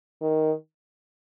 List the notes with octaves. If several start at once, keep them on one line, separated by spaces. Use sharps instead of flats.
D#3